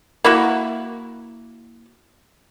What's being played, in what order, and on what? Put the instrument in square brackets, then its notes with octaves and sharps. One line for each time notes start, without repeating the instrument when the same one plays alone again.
[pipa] A#3 E4 F#4